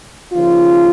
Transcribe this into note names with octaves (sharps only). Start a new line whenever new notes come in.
D#2 C#3 F3 F4